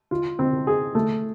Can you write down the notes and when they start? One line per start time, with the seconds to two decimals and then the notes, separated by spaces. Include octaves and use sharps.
0.11 F4
0.39 C4
0.67 G#4
0.95 A3